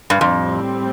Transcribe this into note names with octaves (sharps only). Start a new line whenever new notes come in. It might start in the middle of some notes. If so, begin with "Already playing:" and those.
G2
F2 A2 G3 C4